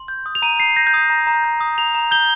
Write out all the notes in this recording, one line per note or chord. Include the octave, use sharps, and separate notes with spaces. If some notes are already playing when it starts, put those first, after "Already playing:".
Already playing: C6
G6
D#6
F7
A#5 D#7
A#5 C7
G6 A#6
G6
D#6 A#6
A#5
A#5
G6
D#6
A#5 F7
A#5
G6 G7